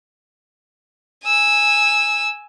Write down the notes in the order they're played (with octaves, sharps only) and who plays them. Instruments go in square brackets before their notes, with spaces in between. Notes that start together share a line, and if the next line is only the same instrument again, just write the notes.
[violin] G#5 E6